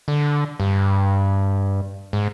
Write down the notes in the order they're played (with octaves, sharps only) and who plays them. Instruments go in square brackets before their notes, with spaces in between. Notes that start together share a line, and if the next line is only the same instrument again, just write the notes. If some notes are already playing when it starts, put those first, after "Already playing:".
[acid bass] D3
G2
G#2